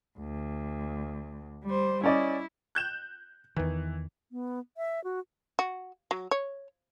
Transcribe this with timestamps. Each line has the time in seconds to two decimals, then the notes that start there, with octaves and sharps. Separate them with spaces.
0.20 D2
1.64 G3 C5
2.04 C#4 E4 D5 D#5
2.75 F#6 G6 E7
3.56 E2 D#3 E3
4.32 B3
4.77 E5
5.04 F#4
5.59 F#4
6.11 F#3
6.31 C#5